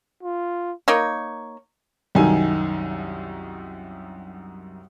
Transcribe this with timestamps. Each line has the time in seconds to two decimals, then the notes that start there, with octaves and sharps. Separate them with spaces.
0.23 F4
0.88 A#3 D#4 C#5
2.15 C2 F#2 D#3 D#4 G#5